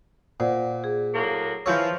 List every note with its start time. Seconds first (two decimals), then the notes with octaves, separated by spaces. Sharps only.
0.40 A#2 C5 D5 F#5
0.84 G#4
1.14 A2 F#3 A#3
1.66 E3 F3 F4 C#5 E6 G6